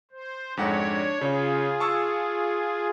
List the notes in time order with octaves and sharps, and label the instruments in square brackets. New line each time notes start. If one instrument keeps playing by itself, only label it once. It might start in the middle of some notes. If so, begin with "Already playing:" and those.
[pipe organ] C5
[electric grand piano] F2 G#2 F#5 [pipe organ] D4 C#5
[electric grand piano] C#3 C#5 [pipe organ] F4 G#4
[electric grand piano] A5 C#6 E6